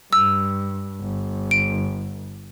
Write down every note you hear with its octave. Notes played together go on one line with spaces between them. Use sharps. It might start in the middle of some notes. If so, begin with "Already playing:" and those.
G2 E6
G1
D7